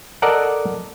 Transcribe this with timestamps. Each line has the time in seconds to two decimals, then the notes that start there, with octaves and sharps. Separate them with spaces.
0.22 A4 A#4 D5 D#5 F#5 A#5